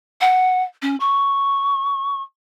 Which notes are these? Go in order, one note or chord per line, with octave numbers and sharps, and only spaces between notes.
F#5
C#4
C#6